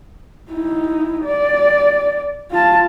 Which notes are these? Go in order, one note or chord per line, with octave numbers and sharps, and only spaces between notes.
D#4 E4
D5
F4 A5